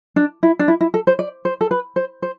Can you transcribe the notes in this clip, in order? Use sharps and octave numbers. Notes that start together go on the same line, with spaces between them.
D4
E4
D4
E4
E4
A4
C5
D5
C5
A4
B4
C5
C5